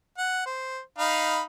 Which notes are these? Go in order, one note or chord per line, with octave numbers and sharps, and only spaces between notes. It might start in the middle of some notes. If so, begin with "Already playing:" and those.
F#5
C5
D#4 F5 B5